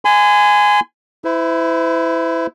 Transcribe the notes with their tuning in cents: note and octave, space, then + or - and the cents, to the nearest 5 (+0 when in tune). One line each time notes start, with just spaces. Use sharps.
G#5 +0 C6 -40
E4 +0 C5 -45